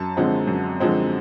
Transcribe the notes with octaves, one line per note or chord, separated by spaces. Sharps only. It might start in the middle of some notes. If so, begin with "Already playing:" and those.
Already playing: F#2 A5
D3 F3 G#3 C4
F#2
D3 F3 G#3 C4